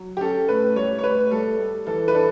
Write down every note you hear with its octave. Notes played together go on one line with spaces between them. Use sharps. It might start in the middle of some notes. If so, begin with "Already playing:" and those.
Already playing: F#3
G4
C#4 A4
A2 B4
G3 C#5
C#5
A2 B4
G3 A4
G3
E3 A4
B4
D4 A4